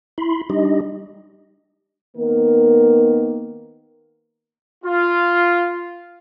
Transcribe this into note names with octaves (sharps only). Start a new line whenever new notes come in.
E4 B5 C6
G3 D4 D#4 G4 D#5
D#3 A#3 B3 A#4
F4